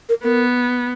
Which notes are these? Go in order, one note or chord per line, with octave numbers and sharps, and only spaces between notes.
A#4
B3 A#4